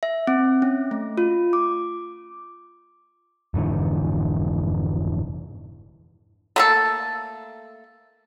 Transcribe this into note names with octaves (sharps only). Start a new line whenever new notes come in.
E5
C4
C#4
A3
F4
D6
F1 G#2 D3 E3
A3 A#3 A4